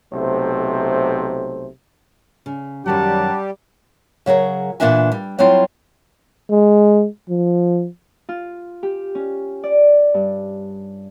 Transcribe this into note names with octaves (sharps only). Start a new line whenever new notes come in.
B1 C3 A3 C5
C#3
F#2 D#3 F#3 G3 G4 F#5 A5
C#3 F#3 G#4 A#4
A#2 E3 B3 D4 E5 G#5
G3
F#3 G3 C4 E4 F4
G#3
F3
F4
G4
C#4
D5
G2